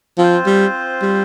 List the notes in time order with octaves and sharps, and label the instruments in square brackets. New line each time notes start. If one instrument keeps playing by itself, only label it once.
[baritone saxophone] F3 [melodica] C4 F4 C5
[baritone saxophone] G3
G3